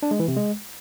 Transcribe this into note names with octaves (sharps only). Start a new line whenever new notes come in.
D4
G#3
E3
C3
G#3